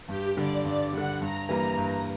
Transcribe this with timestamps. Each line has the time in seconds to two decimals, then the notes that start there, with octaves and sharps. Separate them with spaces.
0.08 G2 G4
0.37 D3 G3 D5
0.65 G2 D5
0.93 D3 G3 F#5
1.21 G2 A#5
1.49 E3 G3 A#3
1.78 G2